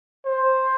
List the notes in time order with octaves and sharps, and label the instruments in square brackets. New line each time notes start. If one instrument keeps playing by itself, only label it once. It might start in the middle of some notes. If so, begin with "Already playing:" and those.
[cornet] C5